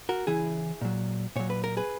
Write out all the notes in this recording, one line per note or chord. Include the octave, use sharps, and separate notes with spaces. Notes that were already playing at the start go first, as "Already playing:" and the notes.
F#4 A#4
C#3 E3 E4 G#4
A#2 F#3
A#2 F#3 C#5
B4
A#4
G#4 B4